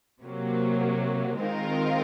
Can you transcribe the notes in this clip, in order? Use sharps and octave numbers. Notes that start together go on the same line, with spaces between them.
C3 F#3 A#3
D#3 G#3 C4 F4 A#4